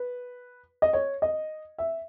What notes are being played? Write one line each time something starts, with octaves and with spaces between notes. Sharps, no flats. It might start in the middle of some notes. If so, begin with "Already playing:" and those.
Already playing: B4
D#5
C#5
D#5
E5